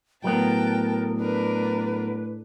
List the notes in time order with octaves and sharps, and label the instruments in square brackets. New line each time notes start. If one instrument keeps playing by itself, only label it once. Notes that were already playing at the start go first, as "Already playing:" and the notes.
[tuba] A2 [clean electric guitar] F#3 B3 [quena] A#4 [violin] G5 A5
[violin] D4 A#4 [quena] B4